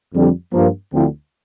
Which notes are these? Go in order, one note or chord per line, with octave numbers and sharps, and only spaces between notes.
F2 D3 G3
G2 F3 A#3
D2 D3 F3 C4 E4